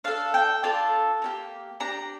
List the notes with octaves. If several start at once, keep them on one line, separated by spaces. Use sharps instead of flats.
D4 A4 F5
G5
D4 F4 A4 A5
A#3 D#4 G4
D4 G4 A#5